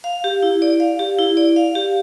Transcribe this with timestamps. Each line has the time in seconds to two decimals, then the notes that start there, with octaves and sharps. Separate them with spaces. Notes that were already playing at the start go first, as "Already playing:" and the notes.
0.04 F5
0.24 G4
0.43 E4
0.62 D5
0.80 F5
0.99 G4
1.19 E4
1.37 D5
1.56 F5
1.75 G4